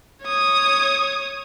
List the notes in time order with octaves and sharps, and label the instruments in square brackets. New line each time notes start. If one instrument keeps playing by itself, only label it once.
[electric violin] C#5 D#6